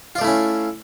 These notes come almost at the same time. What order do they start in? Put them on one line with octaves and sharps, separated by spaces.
F4 D5 A3 E4 C#4